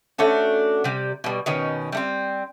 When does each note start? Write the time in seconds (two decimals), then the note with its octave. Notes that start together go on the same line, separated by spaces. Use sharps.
0.18 A3 C#4 D4 F#4
0.84 C3 G3
1.24 B2 G3
1.46 B2 D#3 C#4
1.92 G3 A3 C4